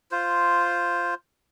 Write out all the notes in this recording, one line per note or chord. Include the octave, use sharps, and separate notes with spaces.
F4 C5